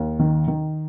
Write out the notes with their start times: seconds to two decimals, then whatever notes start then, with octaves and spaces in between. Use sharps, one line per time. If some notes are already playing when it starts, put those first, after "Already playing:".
Already playing: D#2
0.19 D#3
0.47 D#3